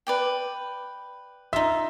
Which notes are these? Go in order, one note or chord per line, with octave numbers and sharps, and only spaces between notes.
B4 D5 G5
D#4 F4 E5